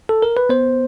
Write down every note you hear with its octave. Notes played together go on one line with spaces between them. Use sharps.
A4
A#4
B4
B3 C5